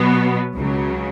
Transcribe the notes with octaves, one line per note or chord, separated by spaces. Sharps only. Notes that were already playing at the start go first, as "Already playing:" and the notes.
Already playing: B2 F#3 B3
C#2 C#3 F#3